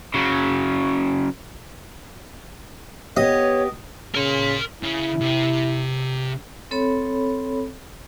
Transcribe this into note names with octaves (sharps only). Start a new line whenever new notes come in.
C#3 F#3
B3 G4 C#5 D#5
C#3 A#4 C6
C#3 E4
C3
C4 A4 C#5 B5